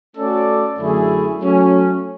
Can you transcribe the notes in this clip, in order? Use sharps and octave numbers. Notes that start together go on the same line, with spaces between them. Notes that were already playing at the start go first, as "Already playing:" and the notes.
A3 C#4 F#4 A4 D5
F#2 D3 A3 E4 G#4
F#3 A3 C#4